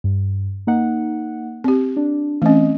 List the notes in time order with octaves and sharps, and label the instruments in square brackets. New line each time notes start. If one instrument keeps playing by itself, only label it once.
[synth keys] G2
A#3 D#4 F#5
[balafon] C4 G4
[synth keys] D4
[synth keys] E3 C4 D#5 [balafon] A3 C#4